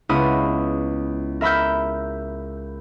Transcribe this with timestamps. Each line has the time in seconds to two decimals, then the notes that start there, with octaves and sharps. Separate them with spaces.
0.09 C#2 B3 E4 D#6
1.41 A#4 E5 B5 E6 G6